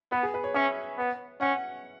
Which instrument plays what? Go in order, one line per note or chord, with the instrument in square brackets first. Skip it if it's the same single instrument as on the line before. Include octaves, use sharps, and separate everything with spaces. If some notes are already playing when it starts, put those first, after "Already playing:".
[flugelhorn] B3 [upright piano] B4
[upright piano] G#4
B4
C#5
[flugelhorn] C#4 [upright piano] E5
[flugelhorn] B3
[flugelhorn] C#4 [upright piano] F#5